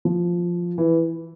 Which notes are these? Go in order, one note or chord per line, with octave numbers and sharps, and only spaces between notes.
F3
E3